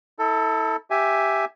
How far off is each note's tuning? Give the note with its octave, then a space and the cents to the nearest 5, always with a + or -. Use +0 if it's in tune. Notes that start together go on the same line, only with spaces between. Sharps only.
E4 -35 A4 +15
G4 +0 E5 +0 G#5 +0